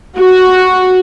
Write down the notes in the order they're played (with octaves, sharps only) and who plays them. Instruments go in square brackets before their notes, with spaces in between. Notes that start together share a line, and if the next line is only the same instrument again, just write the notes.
[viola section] F#4